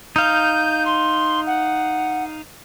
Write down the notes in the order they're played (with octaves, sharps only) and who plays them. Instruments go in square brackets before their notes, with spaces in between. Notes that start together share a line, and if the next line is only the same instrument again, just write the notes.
[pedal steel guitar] D#4 F5 [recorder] G6
[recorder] C6
F#5